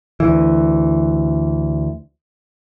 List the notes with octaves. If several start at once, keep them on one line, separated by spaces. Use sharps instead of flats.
D2 E3